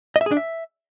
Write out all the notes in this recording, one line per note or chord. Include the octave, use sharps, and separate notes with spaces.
D#5
E5
G#4
D4
E5